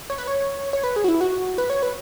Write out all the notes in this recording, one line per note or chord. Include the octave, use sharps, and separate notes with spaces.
C#5
B4
C#5
C#5
B4
G#4
F#4
E4
F#4
B4
C#5
B4